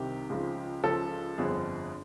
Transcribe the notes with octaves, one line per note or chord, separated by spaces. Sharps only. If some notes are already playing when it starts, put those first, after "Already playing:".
Already playing: C2 C3 D#3 G4
C#2 C#3 F3
C#2 C#3 F3 A4
G1 F2 D3 F3 G#4